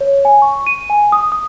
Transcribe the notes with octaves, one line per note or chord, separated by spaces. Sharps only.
C#5
G#5
C#6
D#7
G#5
D#6
D#6